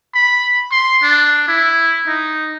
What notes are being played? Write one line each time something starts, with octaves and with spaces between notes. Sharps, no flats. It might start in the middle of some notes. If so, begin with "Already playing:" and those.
B5
C6
D4
E4
D#4